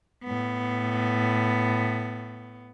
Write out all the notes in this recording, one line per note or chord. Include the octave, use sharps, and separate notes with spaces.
A2 B3